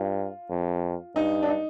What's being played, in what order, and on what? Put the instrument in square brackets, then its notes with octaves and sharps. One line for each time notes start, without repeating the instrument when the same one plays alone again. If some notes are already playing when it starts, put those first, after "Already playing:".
Already playing: [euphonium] G2 [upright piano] F4
[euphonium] F2
[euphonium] G2 [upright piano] D#4
[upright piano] D4
D#4